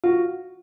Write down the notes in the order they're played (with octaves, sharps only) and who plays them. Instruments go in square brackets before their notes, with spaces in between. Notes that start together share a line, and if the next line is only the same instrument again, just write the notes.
[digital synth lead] F4 [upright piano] F#4